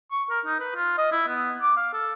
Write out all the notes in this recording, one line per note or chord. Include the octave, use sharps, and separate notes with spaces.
C#6
A#4
D#4
B4
F4
D#5
E4
B3
D6
F5
A4